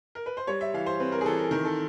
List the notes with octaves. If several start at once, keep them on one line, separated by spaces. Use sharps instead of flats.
A#4
B4
C5
G3 C#5
E5
E3 F5
C5
C4 B4
A#4
G#4
E3 A4
A#4
D#3 A#4
A4